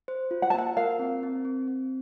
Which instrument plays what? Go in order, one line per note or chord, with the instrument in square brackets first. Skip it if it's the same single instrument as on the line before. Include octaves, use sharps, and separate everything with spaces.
[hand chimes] C5
F4
[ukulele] F#5
A5
[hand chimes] A#3 [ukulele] F#5
[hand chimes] A#4 [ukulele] F5
[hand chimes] C4
C4
C4
C4